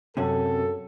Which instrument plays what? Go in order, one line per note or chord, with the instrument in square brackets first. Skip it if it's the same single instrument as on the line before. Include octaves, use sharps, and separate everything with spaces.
[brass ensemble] F#2 A4 [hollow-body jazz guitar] C3 C#4 F#4